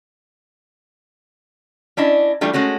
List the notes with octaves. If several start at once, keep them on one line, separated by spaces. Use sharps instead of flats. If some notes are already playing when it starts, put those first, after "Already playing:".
C#4 D4 E4 D#5
E3 G3 A3 D4 F4
G#3 A3 C#4 F#4